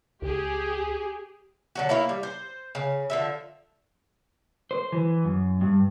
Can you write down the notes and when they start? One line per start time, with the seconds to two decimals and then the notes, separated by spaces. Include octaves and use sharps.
0.22 C#2 G4 G#4
1.75 D3 F#3 F#4
1.89 A#3 E4 F4 C#5
2.09 G3
2.23 C5
2.75 C#3
3.10 D3 F3 E5
4.71 C5
4.92 E3
5.24 F#2
5.61 G2